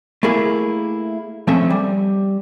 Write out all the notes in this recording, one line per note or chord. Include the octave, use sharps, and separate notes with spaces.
A3 A#3 E4 G#4 A#4
F3 A3 C4 C#4 A4 E5
G3